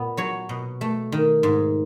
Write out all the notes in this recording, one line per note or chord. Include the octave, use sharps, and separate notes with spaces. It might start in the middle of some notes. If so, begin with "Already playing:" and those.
Already playing: A#2 B3
F#3 C#5
B2
A3
D#3
G#2